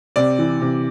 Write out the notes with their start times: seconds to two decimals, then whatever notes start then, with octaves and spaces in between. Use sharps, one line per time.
0.16 C3 D5
0.39 E3
0.61 C3